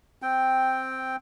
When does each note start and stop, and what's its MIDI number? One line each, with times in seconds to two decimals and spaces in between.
0.22 1.16 60
0.22 1.16 79